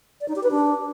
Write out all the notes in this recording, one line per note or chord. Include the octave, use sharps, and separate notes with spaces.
D5
D#4
G4
B4
D4